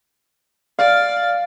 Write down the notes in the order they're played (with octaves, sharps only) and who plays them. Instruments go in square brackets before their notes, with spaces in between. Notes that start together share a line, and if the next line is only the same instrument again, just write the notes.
[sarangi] D5 [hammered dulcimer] F5